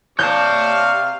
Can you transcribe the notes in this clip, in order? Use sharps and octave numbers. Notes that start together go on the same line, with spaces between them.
C3 C#5 D5 F5 A5 C#6 G6